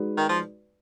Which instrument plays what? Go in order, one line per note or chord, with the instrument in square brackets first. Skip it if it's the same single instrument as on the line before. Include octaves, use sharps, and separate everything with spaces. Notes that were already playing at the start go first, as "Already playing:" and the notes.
Already playing: [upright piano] G#3 D#4 F#4 B4 D5
[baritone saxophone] D#3
F3